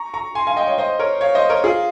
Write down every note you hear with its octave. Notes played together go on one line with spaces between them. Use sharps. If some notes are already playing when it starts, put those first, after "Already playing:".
Already playing: A#5 C#6
A#5 C#6
G#5 C6
F5 G#5
D#5 G5
C#5 F5
C5 D#5
A#4 C#5
C#5 F5
C5 D#5
A#4 C#5
F4 G#4